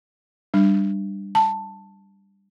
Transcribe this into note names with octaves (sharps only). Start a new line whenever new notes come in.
G3 D4
A5